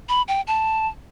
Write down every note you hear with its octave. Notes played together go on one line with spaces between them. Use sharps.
B5
G5
A5